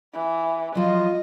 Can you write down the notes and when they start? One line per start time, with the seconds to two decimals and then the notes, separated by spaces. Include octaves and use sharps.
0.13 E3
0.75 F3 F#3 F4 D#5